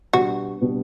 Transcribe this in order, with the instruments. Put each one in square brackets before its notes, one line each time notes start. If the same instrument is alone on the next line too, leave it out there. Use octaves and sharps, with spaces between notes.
[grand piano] B2 G3 B3 D4 [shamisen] F#4
[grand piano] B2 G3 B3 D4